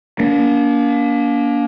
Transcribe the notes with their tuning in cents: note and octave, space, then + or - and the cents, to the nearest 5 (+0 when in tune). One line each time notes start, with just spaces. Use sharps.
A#3 +20 D4 -40